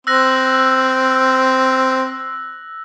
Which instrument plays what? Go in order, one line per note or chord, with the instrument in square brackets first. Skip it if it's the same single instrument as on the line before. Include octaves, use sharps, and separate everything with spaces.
[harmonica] C4 [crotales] E6 F#6 A#6